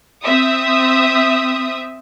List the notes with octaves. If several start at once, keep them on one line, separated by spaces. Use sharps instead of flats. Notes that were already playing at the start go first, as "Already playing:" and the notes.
C4 E5 D#6